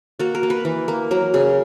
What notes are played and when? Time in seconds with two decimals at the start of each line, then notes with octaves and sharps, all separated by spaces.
0.19 A#3 F#4
0.35 A#4
0.43 A#3
0.50 B4
0.65 E3
0.88 A#3
1.11 F#3 A#4
1.34 C#3 G#4